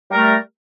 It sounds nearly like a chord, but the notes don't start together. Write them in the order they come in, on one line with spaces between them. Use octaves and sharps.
G3 A#4 A3